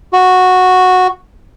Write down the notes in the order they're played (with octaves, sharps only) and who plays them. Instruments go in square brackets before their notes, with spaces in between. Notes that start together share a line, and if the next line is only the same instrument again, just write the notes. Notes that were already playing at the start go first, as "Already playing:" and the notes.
[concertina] F#4